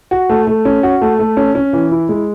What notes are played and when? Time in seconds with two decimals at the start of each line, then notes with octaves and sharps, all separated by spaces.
0.11 F#4
0.29 A3
0.47 A3
0.65 C#4
0.83 F#4
1.02 A3
1.19 A3
1.37 C#4
1.55 C#4
1.73 E3
1.92 E4
2.09 G#3